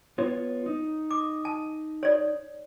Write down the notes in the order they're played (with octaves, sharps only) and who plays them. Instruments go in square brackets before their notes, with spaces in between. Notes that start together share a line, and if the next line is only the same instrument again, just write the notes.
[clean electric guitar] B3 F4 C#5
D#4
[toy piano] D6
A5
C#5 D5